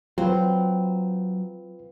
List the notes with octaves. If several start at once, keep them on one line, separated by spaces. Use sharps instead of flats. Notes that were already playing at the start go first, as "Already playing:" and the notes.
F#3 C4 F4 B4